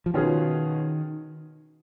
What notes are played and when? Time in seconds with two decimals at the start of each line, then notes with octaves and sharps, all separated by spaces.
0.06 F3
0.14 B2 D#3 F#3 C#4 F4 G#4